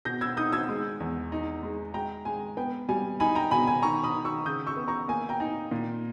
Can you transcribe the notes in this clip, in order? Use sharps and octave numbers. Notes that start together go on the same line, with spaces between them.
B2 G6 A#6
E6 G#6
D#4 D#6 G6
E6 G#6
G#3
E2
D#4
G#3
G#3 G5 A#5
G#3 G#5
B3 G5
G3 G#5
D#4 G#5 B5
G5 A#5
B2 G#5 B5
G#5 B5
D#3 A#5 C#6
B5 D#6
D#3
C#6 E6
C#3 D#6 G6
C#6 E6
B3
A#5 C#6
A#3 G#5
G5 A#5
D#4
A#2